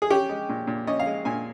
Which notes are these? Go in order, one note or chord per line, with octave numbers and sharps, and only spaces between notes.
G#4
C#4 G4
G#3
A#2
A#2
C#4 D#5
F5
G#3
A#2 G#5